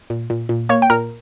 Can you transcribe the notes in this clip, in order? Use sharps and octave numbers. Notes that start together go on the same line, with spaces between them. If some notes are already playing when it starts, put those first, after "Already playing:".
A#2
A#2
A#2
A#3 C#5 C#6
G5
A#2 A#4 A#5